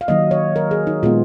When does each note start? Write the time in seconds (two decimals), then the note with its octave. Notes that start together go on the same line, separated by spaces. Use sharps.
0.01 F5
0.08 D#3 F#3 A#3 D#5
0.31 C#5
0.56 A#4
0.71 G#4
0.87 D#4
1.03 A#2 G#3 B3 F4